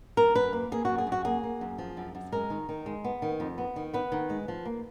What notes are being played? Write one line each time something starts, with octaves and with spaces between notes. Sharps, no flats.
F#2 A#4
F#2 B4
A#3
A#3 G#4
F#2 F#4
G#4
F#2
F#4
A#3 G#4
A#3
F#2
F3
F#2
F#2
G#3 A#4
D#3
D#3
G#3
B3
D#3
F2
B3
D#3
B3 B4
D#3
G#3
F3
A#3